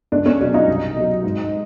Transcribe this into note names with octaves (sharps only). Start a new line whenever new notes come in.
C#2 D4
C#4
B2 F#3 D4
D#4
C2
B2 F#3
G#2